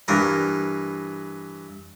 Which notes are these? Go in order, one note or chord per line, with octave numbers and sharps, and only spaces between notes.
G2 E3 A#4